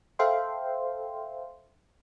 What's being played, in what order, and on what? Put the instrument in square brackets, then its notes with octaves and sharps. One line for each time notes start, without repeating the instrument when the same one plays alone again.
[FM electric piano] A4 C5 E5 F5 G5 C6